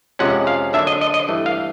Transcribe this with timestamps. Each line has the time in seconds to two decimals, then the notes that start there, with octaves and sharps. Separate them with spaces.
0.19 F2 C3 F3 G#3 C#4 F#5
0.47 F5
0.73 D3 F#3 A#3 D4 E5
0.87 D#5
1.01 D#5
1.14 D#5
1.28 G2 E3 A3
1.46 F5